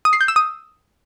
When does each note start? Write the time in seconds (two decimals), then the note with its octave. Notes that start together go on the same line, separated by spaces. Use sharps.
0.05 D#6
0.13 C7
0.21 G6
0.28 E6
0.36 D#6